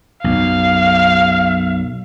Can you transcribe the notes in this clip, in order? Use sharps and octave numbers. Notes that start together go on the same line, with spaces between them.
B1 F#2 F5